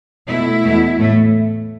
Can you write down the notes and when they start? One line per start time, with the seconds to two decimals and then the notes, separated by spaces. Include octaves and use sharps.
0.27 B2 A3 E4
0.63 E2 B2 A3
0.99 A2 A3